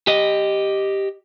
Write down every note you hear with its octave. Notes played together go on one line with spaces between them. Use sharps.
G4 D#5